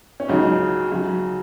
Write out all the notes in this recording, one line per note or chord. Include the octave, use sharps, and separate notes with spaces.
C#4
C#2 C#3 F#3 D#4
C#3 F#3